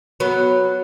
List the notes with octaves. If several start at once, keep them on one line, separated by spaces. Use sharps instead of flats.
F#3 B3